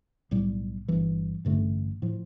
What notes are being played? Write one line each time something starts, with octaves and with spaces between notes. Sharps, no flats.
B1 A2 G3
G1 G2 E3
A1 G2 D3 A3
A2 F3